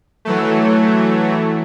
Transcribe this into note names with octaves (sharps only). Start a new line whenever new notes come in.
E3 F#3 A3